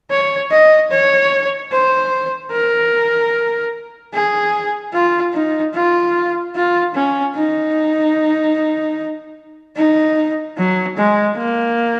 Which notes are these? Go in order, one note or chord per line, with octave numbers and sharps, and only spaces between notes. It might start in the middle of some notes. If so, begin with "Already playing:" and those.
C#5
D#5
C#5
C5
A#4
G#4
F4
D#4
F4
F4
C#4
D#4
D#4
F#3
G#3
A#3